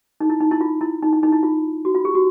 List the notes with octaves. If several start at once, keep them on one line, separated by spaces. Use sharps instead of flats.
D#4
E4
D#4
E4
F4
E4
D#4
D#4
D#4
E4
F4
F#4
F4
G4
F#4